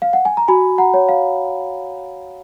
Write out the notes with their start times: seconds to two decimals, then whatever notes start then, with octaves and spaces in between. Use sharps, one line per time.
0.02 F5
0.13 F#5
0.25 G#5
0.37 A#5
0.48 F#4 G#5 B5
0.78 F#5 A#5
0.94 C#5
1.09 F5